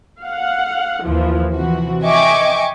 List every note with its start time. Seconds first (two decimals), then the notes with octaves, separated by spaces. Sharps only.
0.22 F5 F#5
1.05 D#2 E3 F3
1.54 C3 E3 F3 F#4
2.04 D#5 E5 G5 G#5 C#6 D6